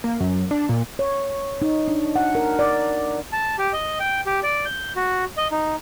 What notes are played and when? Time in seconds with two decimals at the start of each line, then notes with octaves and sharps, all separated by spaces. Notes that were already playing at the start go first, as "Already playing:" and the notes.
0.04 A#3
0.20 F#2
0.51 D4
0.69 A#2
0.99 C#5
1.62 D#4
1.88 D4
2.16 F#5
2.35 A#4
2.59 D5
3.33 A5
3.58 G4
3.73 D#5
4.00 G5
4.26 G4
4.43 D5
4.65 G6
4.96 F#4
5.37 D#5
5.51 D#4